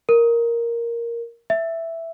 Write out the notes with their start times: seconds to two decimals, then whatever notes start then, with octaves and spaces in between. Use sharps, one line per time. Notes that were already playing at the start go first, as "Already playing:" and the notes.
0.09 A#4
1.50 E5